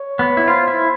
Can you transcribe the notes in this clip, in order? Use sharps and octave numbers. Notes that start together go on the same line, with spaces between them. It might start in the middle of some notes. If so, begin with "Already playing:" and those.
Already playing: C#5
B3
E4
F4 C5
E4